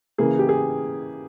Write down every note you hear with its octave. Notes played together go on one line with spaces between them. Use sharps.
C#3 E3 A#3 G#4
G4
G#4